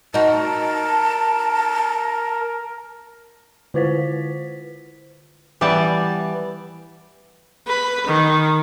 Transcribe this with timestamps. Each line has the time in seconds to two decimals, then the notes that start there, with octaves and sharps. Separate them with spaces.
0.14 D#4 F#4 A#4 A5
3.74 D3 E4 F4 B4 C5 B6
5.61 E3 G3 B3 D5 A5
7.68 B4
8.07 D#3